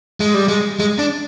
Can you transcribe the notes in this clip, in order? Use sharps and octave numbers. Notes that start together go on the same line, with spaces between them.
G#3
G3
G#3
G#3
D4